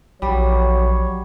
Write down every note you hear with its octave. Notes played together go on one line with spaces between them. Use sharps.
A#1 F#3 G3 C#5